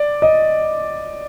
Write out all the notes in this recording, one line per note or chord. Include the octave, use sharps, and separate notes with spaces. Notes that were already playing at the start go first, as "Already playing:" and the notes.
Already playing: D5
D#5